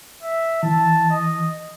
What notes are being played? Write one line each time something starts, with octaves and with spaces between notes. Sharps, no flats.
E5
E3 A5
D#5